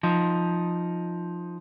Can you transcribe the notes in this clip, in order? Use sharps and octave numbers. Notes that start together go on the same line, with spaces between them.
F3 D#4